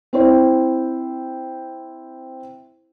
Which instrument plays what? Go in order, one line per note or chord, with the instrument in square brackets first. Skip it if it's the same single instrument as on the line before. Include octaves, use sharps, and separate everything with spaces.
[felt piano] C4 E4 C5